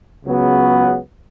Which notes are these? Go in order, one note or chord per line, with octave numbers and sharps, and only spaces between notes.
C#2 C#3 F#3 B3 F#4